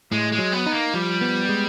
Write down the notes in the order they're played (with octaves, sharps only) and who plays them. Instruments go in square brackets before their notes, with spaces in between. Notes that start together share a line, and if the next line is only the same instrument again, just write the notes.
[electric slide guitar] A2 [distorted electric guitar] G#3
[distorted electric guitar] G#3
[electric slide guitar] F#3
[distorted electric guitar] B3
[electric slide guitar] D#4
[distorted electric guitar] A#3
[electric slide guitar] F3 [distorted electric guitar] G3
[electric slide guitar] B3
G#3